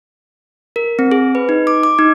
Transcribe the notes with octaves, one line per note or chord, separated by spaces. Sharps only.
A#4
C4
G#4
B4
D#4
D6
D6
D#4